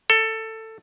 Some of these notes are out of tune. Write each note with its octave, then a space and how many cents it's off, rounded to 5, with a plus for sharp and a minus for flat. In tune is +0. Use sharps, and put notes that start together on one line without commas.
A4 +15